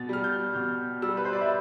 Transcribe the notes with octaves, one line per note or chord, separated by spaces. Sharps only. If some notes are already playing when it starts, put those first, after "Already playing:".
Already playing: B2 A6
G3 F6
G6
B2 F6
G3 E6
B4
C5
D5
E5